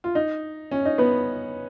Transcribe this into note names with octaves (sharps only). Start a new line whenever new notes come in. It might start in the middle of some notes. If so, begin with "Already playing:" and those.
F4
D#4
C#4
D#4
B3 B4